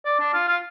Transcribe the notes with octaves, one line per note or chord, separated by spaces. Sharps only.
D5
D4
F4
F4